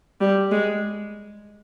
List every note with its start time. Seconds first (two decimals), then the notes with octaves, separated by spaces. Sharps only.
0.21 G3
0.52 G#3